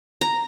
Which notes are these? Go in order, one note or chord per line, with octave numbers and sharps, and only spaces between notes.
A#5